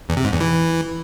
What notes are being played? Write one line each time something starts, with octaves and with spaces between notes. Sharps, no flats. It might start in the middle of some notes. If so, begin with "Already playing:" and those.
E2
C3
G#2
E2
E3